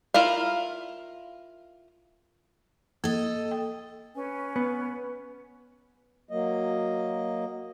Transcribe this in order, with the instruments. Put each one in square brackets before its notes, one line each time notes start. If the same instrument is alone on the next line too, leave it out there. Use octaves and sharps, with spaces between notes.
[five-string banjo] E4 F4 A#4 F5
[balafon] A#3 [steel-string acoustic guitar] A4 D#5
[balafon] G5
[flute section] C#4 B4 G#5
[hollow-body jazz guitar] B3
[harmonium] F#3 A#3 D#5